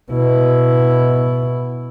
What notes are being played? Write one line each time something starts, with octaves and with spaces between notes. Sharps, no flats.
B2 E4